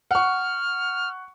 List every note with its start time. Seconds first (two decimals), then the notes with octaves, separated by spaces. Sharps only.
0.11 F#5 C#6 F6